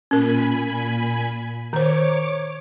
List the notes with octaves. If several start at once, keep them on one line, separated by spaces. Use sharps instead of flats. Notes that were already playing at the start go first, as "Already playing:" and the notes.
A#2 C#4 A#4 G#5 B5
D#3 C5 C#5 D6